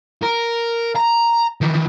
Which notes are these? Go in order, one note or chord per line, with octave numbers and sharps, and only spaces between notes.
A#4
A#5
D#3 E3